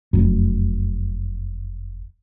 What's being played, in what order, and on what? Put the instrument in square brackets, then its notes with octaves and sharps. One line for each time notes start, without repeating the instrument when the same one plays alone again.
[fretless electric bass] F1 F#2